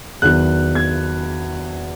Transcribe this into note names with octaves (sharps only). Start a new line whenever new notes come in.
E2 D#3 F#3 F#6
G#6